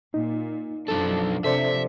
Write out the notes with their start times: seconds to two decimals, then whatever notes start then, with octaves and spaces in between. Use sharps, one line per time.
0.14 A#2 D#4
0.88 B1 F#2 F3 D4 A4
1.44 C3 F3 D4 A4 C5 D5 E5